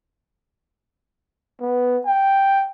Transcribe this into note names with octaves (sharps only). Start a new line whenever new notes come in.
B3
G5